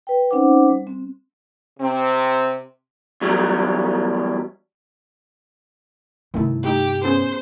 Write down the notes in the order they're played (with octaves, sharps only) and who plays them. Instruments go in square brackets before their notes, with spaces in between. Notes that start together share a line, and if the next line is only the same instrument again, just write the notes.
[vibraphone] B4 G5
C4 C#4 D#4 C5 F#5 D6
G3
C4
[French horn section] C3 C4
[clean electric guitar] E2 F#3 G3
[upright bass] G2 C3 [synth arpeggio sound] D#3 A3 E4
[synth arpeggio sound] A3 D#4 [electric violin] G4
[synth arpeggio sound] B3 C#4 G#4 [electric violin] C5